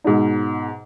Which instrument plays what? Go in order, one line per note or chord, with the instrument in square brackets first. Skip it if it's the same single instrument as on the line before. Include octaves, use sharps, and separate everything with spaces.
[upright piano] G#2 B2 D#4